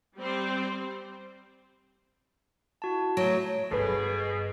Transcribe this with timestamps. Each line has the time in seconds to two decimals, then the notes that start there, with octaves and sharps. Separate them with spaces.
0.17 G3 C4 C5
2.82 E4 F#4 A5
3.17 F#3 A3 C#5 D7
3.71 G1 B2 G#4 A4 B4